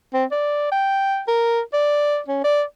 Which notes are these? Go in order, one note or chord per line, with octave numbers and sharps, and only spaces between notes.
C4
D5
G5
A#4
D5
C#4
D5